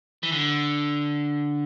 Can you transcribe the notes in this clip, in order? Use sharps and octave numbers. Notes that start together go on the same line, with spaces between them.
E3
D3